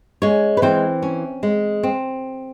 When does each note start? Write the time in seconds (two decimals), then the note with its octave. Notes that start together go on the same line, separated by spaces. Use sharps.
0.22 G#3 C#4 C#5
0.57 B4
0.62 E3 C4 C5
1.02 C#4
1.43 G#3
1.83 C4